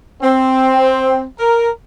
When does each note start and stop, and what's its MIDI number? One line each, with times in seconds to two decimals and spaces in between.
0.22 1.24 60
1.39 1.69 70